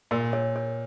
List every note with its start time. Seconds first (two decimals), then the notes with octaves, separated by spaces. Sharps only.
0.11 A#2 A#4
0.33 C#5
0.56 C#5